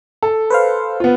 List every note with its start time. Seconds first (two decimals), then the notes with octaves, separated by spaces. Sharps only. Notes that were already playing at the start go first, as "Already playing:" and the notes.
0.23 A4
0.50 B4 C5 F5
1.00 B3 F4